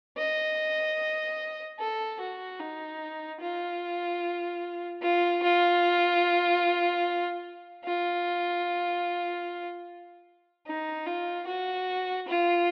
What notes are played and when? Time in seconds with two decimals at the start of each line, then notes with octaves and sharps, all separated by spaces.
0.18 D#5
1.79 A4
2.20 F#4
2.60 D#4
3.41 F4
5.02 F4
5.43 F4
7.84 F4
10.67 D#4
11.06 F4
11.47 F#4
12.28 F4